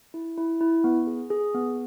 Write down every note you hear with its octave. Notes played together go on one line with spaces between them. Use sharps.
E4
E4
E4
B3
G#4
G#4
B3